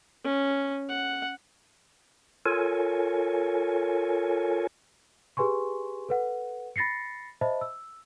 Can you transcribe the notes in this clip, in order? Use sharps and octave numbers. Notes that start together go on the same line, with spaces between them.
C#4
F#5
F4 A4 A#4 C#5 G#5
G4 G#4 B4 G#5 C6 C#6
A4 B4 F#5
B5 A6 A#6 C7 C#7
C5 D#5 E5 A5 B5
E6